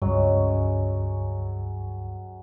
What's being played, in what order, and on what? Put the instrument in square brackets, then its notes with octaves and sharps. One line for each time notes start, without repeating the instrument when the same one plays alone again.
[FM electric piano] C#2 G2 [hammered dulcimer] F#3 G#3 C#4